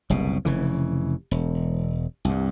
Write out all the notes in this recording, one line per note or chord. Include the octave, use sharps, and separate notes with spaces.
F#1 C2 B2
F1 C#3 E3
E1
C2 G2